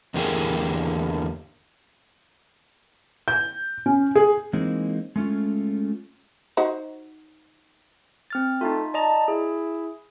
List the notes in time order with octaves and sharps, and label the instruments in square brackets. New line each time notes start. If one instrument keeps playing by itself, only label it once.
[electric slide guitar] E2 D3 A#3 G4 G#4 A#4
[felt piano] G6
C#4
G#4
[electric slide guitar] E3 G#3 A#3 C4 D#4
G#3 A3 C#4 F4
[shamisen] D#4 F#4 C5
[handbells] C4 F6 A6
[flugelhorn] A3 [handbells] D#4 F4
[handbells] D5 D#5 A#5 [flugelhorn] A5
[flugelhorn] E4 [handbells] G#4